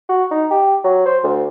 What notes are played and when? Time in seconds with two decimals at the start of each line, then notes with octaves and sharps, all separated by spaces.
0.09 F#4
0.31 D#4
0.51 G4
0.84 F#3
1.06 C5
1.24 D2